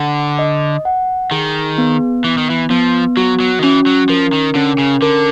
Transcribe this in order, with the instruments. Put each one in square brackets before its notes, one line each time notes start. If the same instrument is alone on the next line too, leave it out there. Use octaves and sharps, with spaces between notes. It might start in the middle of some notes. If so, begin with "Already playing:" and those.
Already playing: [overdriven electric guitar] D3 [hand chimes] F#5
[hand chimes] D#5
F#5
[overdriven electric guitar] D#3 [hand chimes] G#4
[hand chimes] B3
[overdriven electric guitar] E3 [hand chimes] B3
[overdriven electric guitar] D#3
E3
[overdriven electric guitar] F3 [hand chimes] B3
[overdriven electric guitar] F#3 [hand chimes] F#4
[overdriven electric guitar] F#3
D#3
[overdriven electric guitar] E3 [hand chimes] C#4
[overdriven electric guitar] F#3
[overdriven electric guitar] F3 [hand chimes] A#4
[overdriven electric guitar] D#3
[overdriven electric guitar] D3 [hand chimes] C#4
[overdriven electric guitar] C#3
[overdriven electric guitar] D3 [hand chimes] A#4